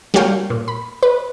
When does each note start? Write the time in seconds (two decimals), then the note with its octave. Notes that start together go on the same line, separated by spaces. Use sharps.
0.14 G3 A#3 F#4 C#5 F5 G5
0.50 A#2
0.68 B5
1.03 B4